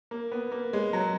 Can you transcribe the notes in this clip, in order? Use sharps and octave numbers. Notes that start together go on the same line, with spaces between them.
A#3
B3
A#3
G#3
F#3